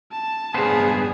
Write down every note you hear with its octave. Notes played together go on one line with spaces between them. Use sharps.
A5
C#2 G2 B3 G#4 C5